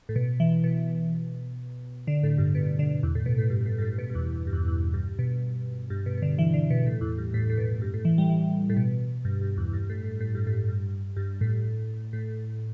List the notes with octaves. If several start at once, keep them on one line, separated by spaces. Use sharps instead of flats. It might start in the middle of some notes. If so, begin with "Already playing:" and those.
A2
B2
E3
B2
D3
A2
G2
B2
D3
E2
A2
B2
A2
G2
A2
G2
A2
B2
G2
E2
G2
E2
E2
G2
B2
G2
B2
B2
D3
E3
D3
B2
A2
E2
G2
A2
A2
B2
G2
A2
E3
G3
E3
A2
B2
G2
G2
E2
G2
A2
A2
A2
G2
A2
G2
G2
A2
A2